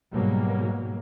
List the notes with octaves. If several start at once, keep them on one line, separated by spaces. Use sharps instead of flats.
G#2 B2 F#3 G3 A#3